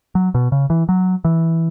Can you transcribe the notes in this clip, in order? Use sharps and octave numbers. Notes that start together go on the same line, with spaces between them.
F#3
B2
C#3
E3
F#3
E3